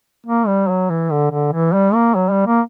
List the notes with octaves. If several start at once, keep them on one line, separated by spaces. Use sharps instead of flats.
A#3
G3
F#3
E3
D3
D3
E3
G3
A#3
F#3
G3
A#3